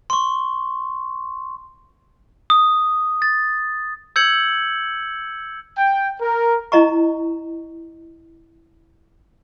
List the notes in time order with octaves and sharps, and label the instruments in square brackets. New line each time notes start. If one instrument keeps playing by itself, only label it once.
[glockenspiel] C6 C#6
D#6
A6
E6 G6 G#6 C#7 F#7
[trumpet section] G5
A#4
[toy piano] E4 D#5 A#5 C#6